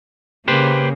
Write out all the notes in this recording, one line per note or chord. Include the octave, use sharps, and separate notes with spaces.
C#3 A#3 G4 B4 C5